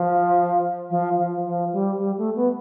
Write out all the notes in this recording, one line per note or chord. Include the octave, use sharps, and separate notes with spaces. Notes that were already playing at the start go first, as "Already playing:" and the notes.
Already playing: F3
F3
F3
F3
G3
G3
A3
B3